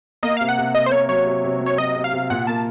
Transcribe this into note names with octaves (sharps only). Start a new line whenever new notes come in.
A#3 D#5
C3 F5
F#5
C3
C3 D#5
C5
A#3 C#5
F#3 C#5
C3
C3
F#3
C#5
F#3 D#5
C3
F5
C3
A#2 F#5
A#3 A5